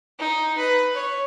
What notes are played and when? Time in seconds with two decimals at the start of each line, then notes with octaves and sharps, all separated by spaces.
0.19 D#4
0.58 B4
0.95 C#5